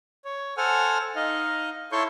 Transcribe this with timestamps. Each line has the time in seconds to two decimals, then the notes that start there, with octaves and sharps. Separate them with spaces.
0.25 C#5
0.57 A4 C5 F#5 G#5 F6
1.16 D#4 D#5 F5
1.92 E4 A4 C#5 C6 C#6 G6